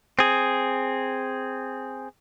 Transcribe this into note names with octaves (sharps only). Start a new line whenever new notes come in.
C4 G#4